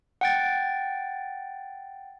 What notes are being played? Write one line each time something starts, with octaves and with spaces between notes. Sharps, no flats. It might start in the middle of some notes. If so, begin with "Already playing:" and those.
F#5 G5 A6